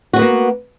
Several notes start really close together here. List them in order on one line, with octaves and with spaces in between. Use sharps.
F#4 C#4 B3 A#3